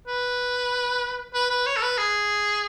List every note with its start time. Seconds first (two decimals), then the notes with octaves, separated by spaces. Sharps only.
0.07 B4
1.34 B4
1.50 B4
1.66 C#5
1.76 A4
1.82 B4
1.98 G#4